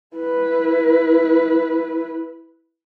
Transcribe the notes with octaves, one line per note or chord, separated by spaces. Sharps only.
E4 B4